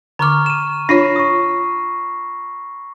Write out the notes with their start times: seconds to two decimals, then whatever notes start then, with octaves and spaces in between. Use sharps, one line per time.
0.19 D3 A#5 C#6 D6 F6
0.46 D#7 E7
0.89 D4 F4 C#5 B5 A#6 C7
1.16 C#6 D#6